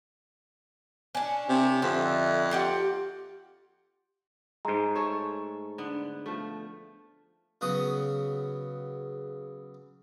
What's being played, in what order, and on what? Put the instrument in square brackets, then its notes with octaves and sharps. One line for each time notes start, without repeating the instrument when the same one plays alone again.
[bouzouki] C#4 D4
[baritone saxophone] C3
[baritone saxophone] F2 [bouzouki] D3 E5
[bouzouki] F4 G4 F#5
[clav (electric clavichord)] G#2 G#3 [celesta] A#5
[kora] A3 A4 C#5
D3 B3
F3 A3
[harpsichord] C#3 F#3 B3 D#6